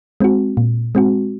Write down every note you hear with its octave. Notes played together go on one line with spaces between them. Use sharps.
G#3 C4 F#4
A#2
G#3 C4 F#4